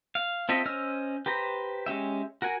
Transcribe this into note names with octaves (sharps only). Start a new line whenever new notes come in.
F5
C4 F4 A4 D#5 E5
C#4 C5 D#5 E6 F6
G4 B4 C5 A#5
G#3 C#4 G4 E5
F#4 A#4 F#5 G#5